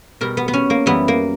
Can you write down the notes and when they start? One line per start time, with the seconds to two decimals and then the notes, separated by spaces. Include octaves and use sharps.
0.21 B2 G3 A#4
0.37 B3
0.48 B3
0.53 C#4
0.70 A#3
0.86 F#2 E3 G3 B3
1.08 A#3